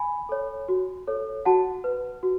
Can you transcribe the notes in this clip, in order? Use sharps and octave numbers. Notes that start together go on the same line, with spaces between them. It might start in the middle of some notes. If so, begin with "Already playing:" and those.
Already playing: G#5 B5
A4 C#5
F#4
A4 C#5
F#4 F#5 A5
B4
F#4